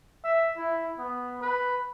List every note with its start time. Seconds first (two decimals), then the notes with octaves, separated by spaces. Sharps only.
0.24 E5
0.57 E4
0.99 B3
1.42 B4